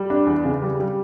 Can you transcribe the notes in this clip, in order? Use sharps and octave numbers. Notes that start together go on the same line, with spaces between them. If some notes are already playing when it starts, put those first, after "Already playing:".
Already playing: G3
D4
E2
C#3
G3
G3